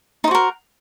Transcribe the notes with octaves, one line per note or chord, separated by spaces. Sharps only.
D#4 F#4 A#4 C5